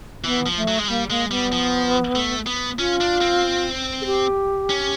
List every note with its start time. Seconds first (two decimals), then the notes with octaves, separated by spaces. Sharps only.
0.24 E3 B3
0.46 F3
0.56 A3
0.68 F#3
0.78 G#3
0.88 G3 A#3
1.10 G#3 A#3
1.30 G3 B3
1.52 F3
2.15 A3
2.47 B3
2.78 C#4 F4
3.00 D4
3.21 C4
4.01 G#4
4.06 G4
4.69 C#4